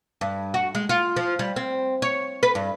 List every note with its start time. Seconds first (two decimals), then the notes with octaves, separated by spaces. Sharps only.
0.21 G2
0.54 F#4
0.75 G#3
0.89 F4
1.16 F3
1.39 G3
1.56 C4
2.02 C#5
2.43 B4
2.55 G2